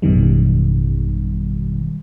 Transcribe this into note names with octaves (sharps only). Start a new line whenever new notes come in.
A1 F#2 B2 D#3 G3